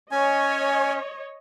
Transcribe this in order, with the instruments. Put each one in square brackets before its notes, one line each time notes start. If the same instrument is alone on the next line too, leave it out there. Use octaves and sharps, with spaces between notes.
[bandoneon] C#4 [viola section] C#5 D#5 [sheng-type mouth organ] G#5